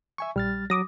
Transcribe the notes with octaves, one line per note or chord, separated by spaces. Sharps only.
E5 G#5 C#6
A#1 G3 F6 A6
F#3 F#4 D6 D#6 A#6